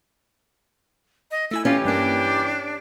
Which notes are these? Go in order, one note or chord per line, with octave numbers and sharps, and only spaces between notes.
D#5
A3 E4 G#5 E6
E3 C#4 F4 G4
G2 A#3 D4